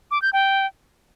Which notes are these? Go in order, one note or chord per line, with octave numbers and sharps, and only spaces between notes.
D6
G6
G5